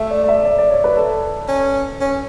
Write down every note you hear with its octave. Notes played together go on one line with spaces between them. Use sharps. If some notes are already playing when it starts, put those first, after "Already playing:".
Already playing: A3 E5
D5
D5
E5
D5
D5
C#5
B4
A4
C#4
C#4